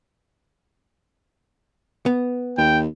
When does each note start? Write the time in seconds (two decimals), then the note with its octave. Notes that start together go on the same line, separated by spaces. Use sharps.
2.06 B3
2.58 D#2 G5